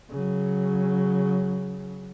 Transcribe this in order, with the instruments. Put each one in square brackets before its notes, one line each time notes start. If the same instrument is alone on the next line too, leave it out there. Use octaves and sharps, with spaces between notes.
[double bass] C#3 F#3